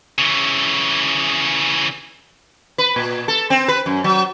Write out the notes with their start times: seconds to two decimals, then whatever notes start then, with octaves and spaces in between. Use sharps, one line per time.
0.18 C#3 E3
2.78 B4
2.96 A#2
3.28 A4
3.50 C4
3.68 B4
3.86 F#2
4.04 F#3